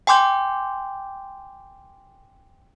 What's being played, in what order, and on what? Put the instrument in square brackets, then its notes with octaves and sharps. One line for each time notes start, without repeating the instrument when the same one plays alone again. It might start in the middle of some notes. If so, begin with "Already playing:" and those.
[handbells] G5 G#5 C6 D6 G6